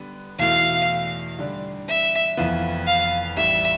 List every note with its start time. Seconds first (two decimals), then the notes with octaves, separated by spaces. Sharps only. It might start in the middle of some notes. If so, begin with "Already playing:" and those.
Already playing: D3 G3 B3
0.39 E2 B2 A3 E4 F5
1.39 D3 G3 D4
1.88 E5
2.37 F1 F2 E3 B3 F4
2.87 F5
3.36 A1 A2 G3 D4 G4 E5